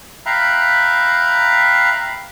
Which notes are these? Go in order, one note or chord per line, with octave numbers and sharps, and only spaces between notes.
E5 F5 G5 A#5 B5 F#6